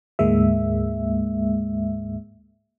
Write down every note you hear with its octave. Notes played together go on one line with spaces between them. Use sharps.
D2 G#2 G#3 A#3 E5